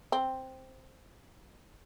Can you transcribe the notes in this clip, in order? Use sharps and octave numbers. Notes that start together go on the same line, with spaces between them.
C4